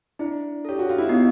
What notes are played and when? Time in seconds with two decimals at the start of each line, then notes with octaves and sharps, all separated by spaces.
0.19 D4 E4
0.65 G4 A4 C#5
0.79 F#4
0.89 F4
0.98 E4
1.09 B3 D#4